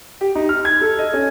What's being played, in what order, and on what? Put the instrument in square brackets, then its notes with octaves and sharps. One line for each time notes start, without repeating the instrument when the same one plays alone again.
[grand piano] G4
D#4
F6
G#6
A4
D#5
C#4